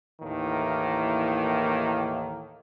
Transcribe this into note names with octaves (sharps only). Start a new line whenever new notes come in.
D#2 A2 D#3 E3 A#3